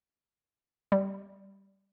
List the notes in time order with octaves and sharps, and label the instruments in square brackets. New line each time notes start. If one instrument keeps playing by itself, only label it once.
[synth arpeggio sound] G3